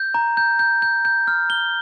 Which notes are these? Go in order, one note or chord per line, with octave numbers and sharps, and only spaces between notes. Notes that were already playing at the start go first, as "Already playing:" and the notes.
Already playing: G6
A#5
G6
G6
G6
G6
F6
G7